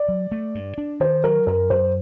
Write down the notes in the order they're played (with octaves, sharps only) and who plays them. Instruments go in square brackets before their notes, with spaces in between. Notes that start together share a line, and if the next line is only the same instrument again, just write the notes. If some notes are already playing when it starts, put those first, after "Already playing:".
Already playing: [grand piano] D5
[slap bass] F#3
A3
G2
D4
[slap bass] D#3 [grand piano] C5
[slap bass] F#3 [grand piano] A#4
[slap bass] F#2 [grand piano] A#4
[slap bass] F#2 [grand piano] C5